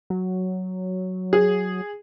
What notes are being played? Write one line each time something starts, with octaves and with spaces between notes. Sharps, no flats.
F#3
G#4